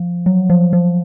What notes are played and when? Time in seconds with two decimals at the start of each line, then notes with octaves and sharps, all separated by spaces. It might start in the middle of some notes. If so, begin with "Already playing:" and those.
Already playing: F3
0.26 F#3
0.50 F3
0.73 F3